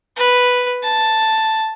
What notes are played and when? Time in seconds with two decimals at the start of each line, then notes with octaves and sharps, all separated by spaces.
0.16 B4
0.83 A5